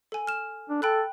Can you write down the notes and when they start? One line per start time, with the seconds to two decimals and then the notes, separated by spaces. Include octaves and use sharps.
0.12 A4 G#5
0.27 F6 E7
0.69 D4
0.82 A4 G5 B5 F#6